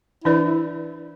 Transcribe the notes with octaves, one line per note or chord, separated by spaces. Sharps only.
E3 D4 E4 B4 D5
E4